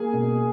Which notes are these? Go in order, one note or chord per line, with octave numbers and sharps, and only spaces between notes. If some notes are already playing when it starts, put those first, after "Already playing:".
Already playing: A#3 G#4 G#5
B2